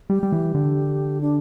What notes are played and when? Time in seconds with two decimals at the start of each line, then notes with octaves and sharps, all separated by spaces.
0.10 G3 G4
0.23 G3
0.32 E3
0.55 D3
1.21 D4